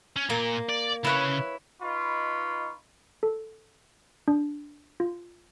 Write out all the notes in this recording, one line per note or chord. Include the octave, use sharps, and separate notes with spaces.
C#4
A#2 A#3
D5
C#3 E4 B4 C#5
D#4 F4 B4 D#5 B5 C#6
A4
D4
F4